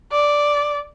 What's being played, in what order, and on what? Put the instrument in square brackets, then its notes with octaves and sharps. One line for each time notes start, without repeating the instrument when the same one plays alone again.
[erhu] D5